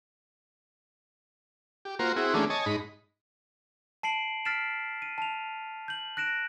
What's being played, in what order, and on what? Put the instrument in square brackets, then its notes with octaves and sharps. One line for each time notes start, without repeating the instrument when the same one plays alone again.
[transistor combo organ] G4
A#3 F4 F#4 A#4 C5
C4 E4 F#4 G#4
E3 A3 A#3 C#4 D4 G#4
C#5 D#5 G#5 A5
G#2 D#4 B5
[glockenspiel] A5 C7 D7 F#7
F6 A6 B6 C7 D7 E7
D#7
A5 F7
G6 F#7
F#6 A#6 D7 E7